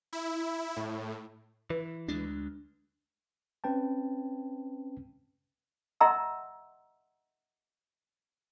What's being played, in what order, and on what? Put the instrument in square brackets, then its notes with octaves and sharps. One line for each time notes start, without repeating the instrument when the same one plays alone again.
[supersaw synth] E4
A2
[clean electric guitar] E3 [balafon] B4
[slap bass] D2 G#3 D4
[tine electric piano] C4 C#4 B4 G5 A5
[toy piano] D#5 E5 F#5 A#5 C6 E6